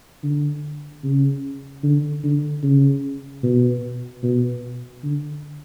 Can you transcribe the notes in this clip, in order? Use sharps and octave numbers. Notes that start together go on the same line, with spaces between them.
D3
C#3
D3
D3
C#3
B2
B2
D3